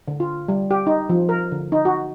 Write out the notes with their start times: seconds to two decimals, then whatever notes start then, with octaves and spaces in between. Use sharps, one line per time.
0.08 D3
0.20 F4
0.48 G3
0.71 G4
0.87 D#4
1.09 F3
1.29 A#4
1.52 D3
1.72 D#4
1.85 F#4